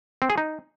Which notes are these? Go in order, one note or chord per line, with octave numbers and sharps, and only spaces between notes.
C4
G#4
D#4